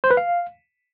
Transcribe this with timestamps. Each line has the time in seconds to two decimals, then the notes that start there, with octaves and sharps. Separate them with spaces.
0.04 C5
0.11 B4
0.17 F5